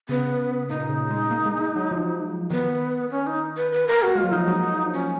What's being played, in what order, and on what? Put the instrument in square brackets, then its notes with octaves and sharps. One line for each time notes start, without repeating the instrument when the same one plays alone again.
[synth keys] C#3 [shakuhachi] B3
[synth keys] A#2 [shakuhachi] D#4
[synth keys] C#3
G#3
A#3
G#3
G#3
F#3
F3
[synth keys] D#3 [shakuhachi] B3
[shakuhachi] C#4
D#4
B4
B4
A#4
[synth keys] A#3 [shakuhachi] F#4
[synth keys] G#3 [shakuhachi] F4
[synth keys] F#3
[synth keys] F3 [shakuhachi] D#4
[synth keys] F#3
F#3
F3
[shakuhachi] C#4